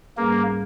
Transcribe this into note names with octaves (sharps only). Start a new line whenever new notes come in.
G#2 G3 A#3 C#4 G#4 B4